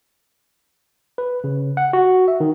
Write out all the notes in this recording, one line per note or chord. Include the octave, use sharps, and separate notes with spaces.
B4
C#3
F#5
F#4
E5
D#3